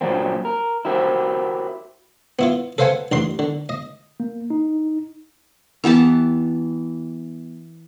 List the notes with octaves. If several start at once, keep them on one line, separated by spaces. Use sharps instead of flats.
G2 A#2 F#3 G3 A#3 C4
A#4
E4 F#4 G4 A#4 C5
B3 E4 F4
A4 B4 C5 F5 F#5 G#5
A1 G2 C6
D3
D#5
A#3
D#4
E3 B3 G4 A5